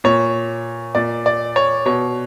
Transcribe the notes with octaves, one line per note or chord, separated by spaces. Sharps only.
A#2 C#5
A#2 D5
D5
C#5
B2 C#5